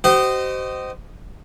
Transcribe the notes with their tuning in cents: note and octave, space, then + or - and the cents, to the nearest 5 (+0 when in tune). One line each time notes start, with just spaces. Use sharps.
G4 -45 C5 -20 D#5 -10